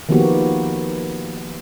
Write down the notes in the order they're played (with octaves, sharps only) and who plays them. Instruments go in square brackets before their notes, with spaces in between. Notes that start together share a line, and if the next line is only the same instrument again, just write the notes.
[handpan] D#3 F3 A#3 B3 F#4 G4